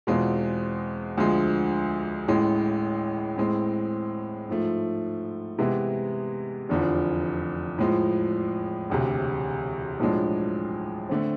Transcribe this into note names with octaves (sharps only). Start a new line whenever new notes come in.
E2 B2 G#3 C4 F4
D2 D3 F3 G#3
A1 A2 E3 G#3
A2 G#3 C4
G#2 F3 A3
C3 E3 G#3 B3 E4
F1 E2 D3 F3
A2 F3 G#3
E1 D2 C3
B1 A2 F3 G#3 D4
D3 A3 C4